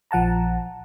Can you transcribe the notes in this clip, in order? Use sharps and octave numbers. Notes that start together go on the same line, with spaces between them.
A#1 F3 F#5 A5 A#5